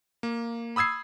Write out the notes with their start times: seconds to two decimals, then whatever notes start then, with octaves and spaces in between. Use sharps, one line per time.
0.23 A#3
0.76 B5 D#6 E6 G#6 C7